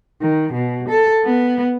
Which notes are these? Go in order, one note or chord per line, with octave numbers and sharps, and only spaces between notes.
D#3
B2
A4
B3